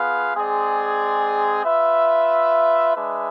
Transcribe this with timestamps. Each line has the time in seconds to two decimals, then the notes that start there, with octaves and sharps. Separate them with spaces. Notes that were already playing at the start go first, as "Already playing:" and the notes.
Already playing: B3 F4 G#4 B4 F5
0.33 G#3 C4 G#4 D5
1.64 F4 B4 E5
2.96 G#3 D4 G#4 B4 E5